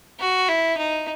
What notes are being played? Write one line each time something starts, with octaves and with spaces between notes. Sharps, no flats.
F#4
E4
D#4